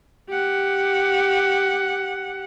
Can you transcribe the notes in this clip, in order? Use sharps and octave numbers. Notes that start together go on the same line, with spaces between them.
G4 F#5